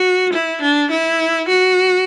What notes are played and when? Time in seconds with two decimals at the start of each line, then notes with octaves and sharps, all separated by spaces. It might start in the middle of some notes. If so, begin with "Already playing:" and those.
Already playing: F#4
0.33 E4
0.62 D4
0.91 E4
1.49 F#4